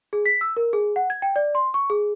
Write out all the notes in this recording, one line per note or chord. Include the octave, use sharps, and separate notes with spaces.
G#4
B6
E6
A#4
G#4
F#5
G#6
G5
D5
C6
C#6
G#4